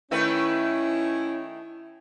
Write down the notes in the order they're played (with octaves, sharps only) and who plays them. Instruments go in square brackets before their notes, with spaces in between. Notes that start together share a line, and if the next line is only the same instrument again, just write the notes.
[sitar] D#3 A3 B4 [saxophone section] C#4 E4